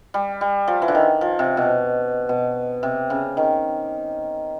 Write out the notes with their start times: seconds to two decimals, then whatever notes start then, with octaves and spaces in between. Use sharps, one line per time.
0.14 G3
0.41 G3
0.68 F3
0.82 E3
0.88 D3
0.95 D#3
1.21 F3
1.39 C3
1.57 B2
2.29 B2
2.83 C3
3.10 C#3
3.37 D#3